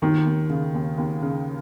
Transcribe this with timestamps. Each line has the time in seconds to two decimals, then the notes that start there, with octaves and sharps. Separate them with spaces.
0.02 D#2 D#3
0.26 D#2
0.50 C#3
0.74 D#2
0.98 D#2
1.22 C#3